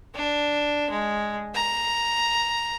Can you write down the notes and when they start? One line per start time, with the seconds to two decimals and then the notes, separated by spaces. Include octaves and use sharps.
0.15 D4
0.90 G#3
1.54 A#5